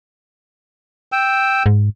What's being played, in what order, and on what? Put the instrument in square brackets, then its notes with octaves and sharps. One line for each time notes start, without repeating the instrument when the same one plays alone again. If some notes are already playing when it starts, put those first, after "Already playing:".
[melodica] G5 E6
[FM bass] G#2